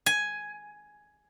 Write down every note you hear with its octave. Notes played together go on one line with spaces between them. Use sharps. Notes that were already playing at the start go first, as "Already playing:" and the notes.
G#5